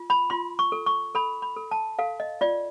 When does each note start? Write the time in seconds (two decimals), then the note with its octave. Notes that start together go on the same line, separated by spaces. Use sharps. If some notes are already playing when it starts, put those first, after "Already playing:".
Already playing: F4
0.10 B5
0.30 F4 C6
0.59 C#6
0.72 A4
0.86 C#6
1.15 A4 B5
1.42 B5
1.56 A4
1.71 A5
1.99 A4 F5
2.20 D#5
2.41 F4 D5